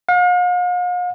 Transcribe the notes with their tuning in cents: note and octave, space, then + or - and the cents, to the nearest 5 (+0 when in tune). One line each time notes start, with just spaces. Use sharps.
F5 +45